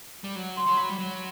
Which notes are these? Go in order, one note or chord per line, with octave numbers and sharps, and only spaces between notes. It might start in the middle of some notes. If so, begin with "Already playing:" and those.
G3
F#3
C6
F#3
B5
G3
F#3